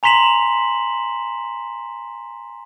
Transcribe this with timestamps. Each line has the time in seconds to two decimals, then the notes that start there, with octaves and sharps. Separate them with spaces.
0.03 G#5 A#5 C6 B6 E7 F#7